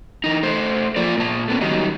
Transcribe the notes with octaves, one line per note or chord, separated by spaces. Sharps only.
E3 D#4
A3 C5
F3 A#3 F4 D5
A#2 A5
A3 B3 C#4
D#3 F#3 G3 D#4